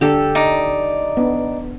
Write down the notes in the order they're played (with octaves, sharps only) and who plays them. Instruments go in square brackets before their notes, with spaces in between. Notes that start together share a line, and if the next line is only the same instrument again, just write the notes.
[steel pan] D3 D4 [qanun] G4 A4
[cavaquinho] D#4 D5
[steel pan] B3 D4